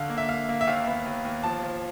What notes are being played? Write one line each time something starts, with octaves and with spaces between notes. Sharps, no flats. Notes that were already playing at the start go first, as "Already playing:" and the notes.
Already playing: D3 F5
A#3
E5
A#3 F5
A#3
E5
D#2 F5
B3
D#2
D#2
F3 A5
F3